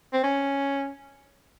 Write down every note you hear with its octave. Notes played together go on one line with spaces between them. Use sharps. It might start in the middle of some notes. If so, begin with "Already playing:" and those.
C4
C#4